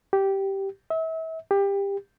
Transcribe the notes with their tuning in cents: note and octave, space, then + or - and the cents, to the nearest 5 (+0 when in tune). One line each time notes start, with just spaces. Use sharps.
G4 -10
E5 -35
G4 +20